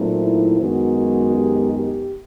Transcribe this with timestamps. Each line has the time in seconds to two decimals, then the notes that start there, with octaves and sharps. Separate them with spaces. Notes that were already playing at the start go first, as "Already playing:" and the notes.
Already playing: A#2 F#3 A3 C4 D#4
0.20 E4
0.58 F#2 D#3 G#3 B3 D#4 F#4
0.96 F#4
1.34 G4
1.72 G4